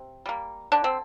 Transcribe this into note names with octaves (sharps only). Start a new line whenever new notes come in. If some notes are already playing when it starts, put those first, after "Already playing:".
Already playing: C3
G3 A#3
D3 D4
C4